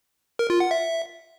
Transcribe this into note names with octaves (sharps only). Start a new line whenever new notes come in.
A#4
F4
F#5
E5